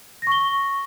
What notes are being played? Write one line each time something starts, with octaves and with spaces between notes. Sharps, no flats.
C#6 A#6 G7